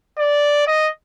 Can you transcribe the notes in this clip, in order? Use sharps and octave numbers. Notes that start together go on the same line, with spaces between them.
D5
D#5